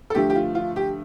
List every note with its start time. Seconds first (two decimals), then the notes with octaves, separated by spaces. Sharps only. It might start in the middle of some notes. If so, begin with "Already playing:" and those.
0.10 A4
0.15 G2 D3 F3 A3 G4
0.30 G4
0.36 F4
0.55 F4
0.76 G4